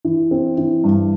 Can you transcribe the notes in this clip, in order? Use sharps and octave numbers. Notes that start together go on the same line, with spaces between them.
E3
C4
E3
G2